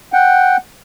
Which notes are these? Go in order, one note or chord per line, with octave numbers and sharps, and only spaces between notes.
F#5 G5